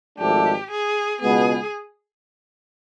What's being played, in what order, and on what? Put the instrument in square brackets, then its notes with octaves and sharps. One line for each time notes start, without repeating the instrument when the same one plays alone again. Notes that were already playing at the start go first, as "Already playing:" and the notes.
[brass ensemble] G#1 G#2 F3 A3 D4 [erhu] G4
[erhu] G#4
[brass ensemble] C#2 B2 G#3 B3 [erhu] G#4